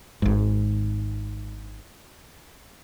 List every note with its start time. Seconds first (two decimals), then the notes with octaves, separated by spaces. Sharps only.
0.22 G#1 G#2